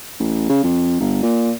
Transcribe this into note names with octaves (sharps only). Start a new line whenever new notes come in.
A1
C#3
F2
G1
A#2